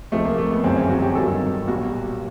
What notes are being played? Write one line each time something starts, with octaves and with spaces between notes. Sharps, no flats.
C#2 C3 F3 A3
A#3
A3
B3
G1 F#2 C#3 E3 C4
C#4
F#4
G4
G#1 G2 D#3 F#3 A4
B1 A#2 G3 F#4